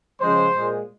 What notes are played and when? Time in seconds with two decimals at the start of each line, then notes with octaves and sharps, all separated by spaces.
0.20 C#3 F3 G#3 C5
0.52 A#2 G#3